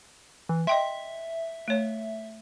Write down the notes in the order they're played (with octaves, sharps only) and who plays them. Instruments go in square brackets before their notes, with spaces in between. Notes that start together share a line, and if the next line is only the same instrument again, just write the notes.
[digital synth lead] E3
[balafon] D#5 G5 C6 [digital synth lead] E5
[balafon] A3 C#5